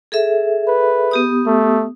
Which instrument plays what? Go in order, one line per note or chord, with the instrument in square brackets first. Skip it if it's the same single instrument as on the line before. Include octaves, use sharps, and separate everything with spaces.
[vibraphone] G#4 A4 E5
[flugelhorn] B4
[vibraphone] B3 G4 D#6
[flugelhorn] A3